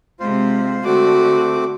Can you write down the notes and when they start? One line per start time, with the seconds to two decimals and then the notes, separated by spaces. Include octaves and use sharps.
0.20 C3 G#3 F4 C5
0.85 D3 A3 C4 F#4 D6